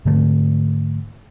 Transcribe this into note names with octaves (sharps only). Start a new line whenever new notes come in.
G#2 D3 A3